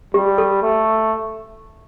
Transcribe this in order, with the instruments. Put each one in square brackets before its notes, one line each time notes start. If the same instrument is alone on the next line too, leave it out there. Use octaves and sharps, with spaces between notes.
[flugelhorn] G3 [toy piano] G4
[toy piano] A4
[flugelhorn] A3